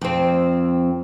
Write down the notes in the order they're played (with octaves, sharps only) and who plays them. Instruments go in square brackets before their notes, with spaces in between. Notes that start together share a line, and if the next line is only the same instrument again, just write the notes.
[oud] F2 C4